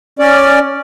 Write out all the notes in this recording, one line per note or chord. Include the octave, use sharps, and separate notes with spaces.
C#4 D5